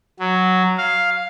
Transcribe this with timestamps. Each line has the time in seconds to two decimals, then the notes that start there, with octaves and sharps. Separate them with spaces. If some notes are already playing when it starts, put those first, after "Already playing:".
0.19 F#3
0.77 F5